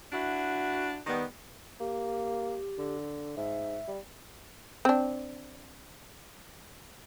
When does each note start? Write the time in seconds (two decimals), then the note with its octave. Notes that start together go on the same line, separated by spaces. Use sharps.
0.13 D4 E4 F#4
1.07 D#3 G3 B3
1.80 A#3 G4
2.78 D3
3.37 G#2 E5
3.87 G3
4.85 C4 D4